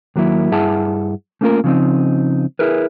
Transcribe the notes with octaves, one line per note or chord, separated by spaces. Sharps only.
D#2 F#3 A#3 E4
G2 E4 G#4 E5 F#5 A5
A3 A#3 C#4 F4 G4 A#4
C#3 F3 C4 D#4
E4 G#4 A#4 B4